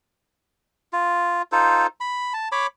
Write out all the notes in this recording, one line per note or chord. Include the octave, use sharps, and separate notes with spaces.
F4
D#4 F4 A4 C5
B5
A5
C#5 B5 D6